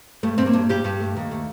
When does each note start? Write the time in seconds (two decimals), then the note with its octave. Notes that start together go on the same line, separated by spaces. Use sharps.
0.23 G2 A3
0.38 G2 C4
0.46 A#3
0.53 G2
0.69 G2 G4
0.84 G2
1.00 A3
1.16 D#2
1.31 A3